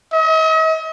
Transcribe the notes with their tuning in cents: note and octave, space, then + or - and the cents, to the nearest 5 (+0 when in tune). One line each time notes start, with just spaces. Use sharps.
D#5 +45